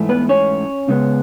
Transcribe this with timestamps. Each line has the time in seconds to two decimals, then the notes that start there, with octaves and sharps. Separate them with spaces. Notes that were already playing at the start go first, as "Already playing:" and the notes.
Already playing: G#2 E3 A3
0.09 B3 B4
0.29 C#4 C#5
0.88 C#3 G#3 B3